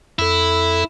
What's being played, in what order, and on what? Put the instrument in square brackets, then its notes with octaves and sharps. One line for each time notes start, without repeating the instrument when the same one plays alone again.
[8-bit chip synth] F2 A4 [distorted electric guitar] E4